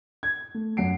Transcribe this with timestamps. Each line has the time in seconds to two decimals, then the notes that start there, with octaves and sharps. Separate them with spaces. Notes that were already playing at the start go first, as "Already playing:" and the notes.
0.23 G#6
0.54 A3
0.77 F#2 F#5 C7 D7